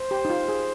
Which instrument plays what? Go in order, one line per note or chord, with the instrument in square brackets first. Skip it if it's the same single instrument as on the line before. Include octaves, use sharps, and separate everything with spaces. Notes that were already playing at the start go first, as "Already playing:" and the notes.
Already playing: [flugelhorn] C5
[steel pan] G4
D#4
F4
G#4